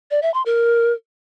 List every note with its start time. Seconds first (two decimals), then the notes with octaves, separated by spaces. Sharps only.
0.11 D5
0.22 E5
0.34 C6
0.46 A#4